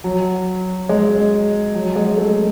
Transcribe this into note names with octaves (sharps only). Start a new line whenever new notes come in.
F#3
G#3
F#3
G#3
A3